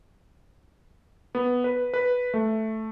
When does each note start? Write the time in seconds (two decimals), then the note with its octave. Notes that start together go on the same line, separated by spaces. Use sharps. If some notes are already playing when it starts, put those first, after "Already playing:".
1.35 B3
1.64 B4
1.94 B4
2.34 A3